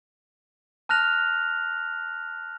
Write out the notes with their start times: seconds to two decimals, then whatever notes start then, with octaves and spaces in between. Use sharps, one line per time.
0.89 A5 F6 F#6 A#6 F7